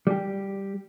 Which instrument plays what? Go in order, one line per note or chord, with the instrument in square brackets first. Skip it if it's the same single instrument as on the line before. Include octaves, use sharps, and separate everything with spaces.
[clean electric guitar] G3 G4